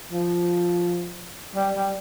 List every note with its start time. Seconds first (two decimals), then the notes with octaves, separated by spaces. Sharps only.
0.12 F3
1.55 G3
1.76 G3